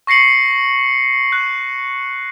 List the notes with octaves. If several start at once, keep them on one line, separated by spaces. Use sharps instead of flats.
C#6 A#6 C7 C#7 F#7
F#6